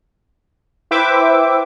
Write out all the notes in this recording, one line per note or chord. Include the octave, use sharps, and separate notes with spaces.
E4 B4 C5 E5 G5 D6